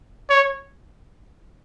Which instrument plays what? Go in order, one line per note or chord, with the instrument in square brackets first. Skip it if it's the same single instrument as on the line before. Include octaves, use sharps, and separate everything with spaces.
[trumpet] C#5